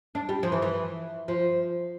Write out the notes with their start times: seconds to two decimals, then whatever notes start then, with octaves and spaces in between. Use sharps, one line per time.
0.15 D4
0.29 G3
0.43 F3
0.52 E3
0.62 E3
1.28 F3